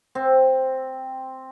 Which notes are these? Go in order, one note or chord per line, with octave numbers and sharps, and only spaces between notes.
C4